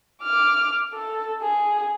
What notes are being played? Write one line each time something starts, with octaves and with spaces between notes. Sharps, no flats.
D6 F6
A4
G#4